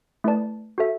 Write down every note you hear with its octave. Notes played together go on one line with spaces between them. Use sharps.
A3 E4 B4 D5 A5
F#4 A4 E5